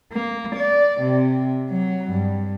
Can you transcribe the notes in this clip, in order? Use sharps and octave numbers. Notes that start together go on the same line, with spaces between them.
A#3
D5
C3
F#3
G2